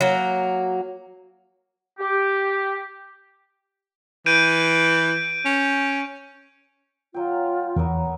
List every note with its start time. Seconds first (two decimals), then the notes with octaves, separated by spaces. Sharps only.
0.01 F#3 A#3
1.99 G4
4.26 E3 G6 D7 D#7
5.45 C#4
7.14 F#3 F4 G5
7.76 E2 F#3 B3 A#4